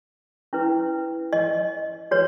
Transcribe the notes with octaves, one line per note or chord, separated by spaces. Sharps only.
C#4 E4 B4
D#5
F#4 B4 C#5